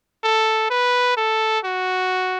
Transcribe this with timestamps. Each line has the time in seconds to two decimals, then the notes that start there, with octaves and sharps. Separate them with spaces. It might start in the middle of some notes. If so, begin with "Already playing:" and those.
0.24 A4
0.70 B4
1.17 A4
1.65 F#4